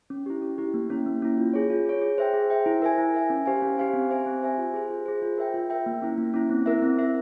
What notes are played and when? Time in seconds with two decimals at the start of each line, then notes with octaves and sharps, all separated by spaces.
0.10 C#4
0.26 E4 G4
0.42 C#4
0.58 E4 G4
0.74 A#3
0.90 C#4 E4
1.06 A#3
1.22 C#4 E4
1.38 F4
1.54 G#4 C#5
1.70 F4
1.86 G#4 C#5
2.02 G#4
2.18 C5 E5 G5
2.34 G#4
2.50 C5 E5 G5
2.66 E4
2.82 A#4 E5 G#5
2.98 E4
3.14 A#4 E5 G#5
3.30 C#4
3.46 G4 C5 F5 G#5
3.62 C#4
3.78 G4 C5 F5 G#5
3.94 C4
4.10 G4 C5 E5 G#5
4.26 C4
4.42 G4 C5 E5 G#5
4.58 F4
4.74 G#4 C5
4.90 F4
5.06 G#4 C5
5.22 F4
5.38 A#4 E5 G5
5.54 F4
5.70 A#4 E5 G5
5.86 A#3
6.02 C#4 E4
6.18 A#3
6.34 C#4 E4
6.50 C4
6.66 E4 A#4 E5
6.82 C4
6.98 E4 A#4 E5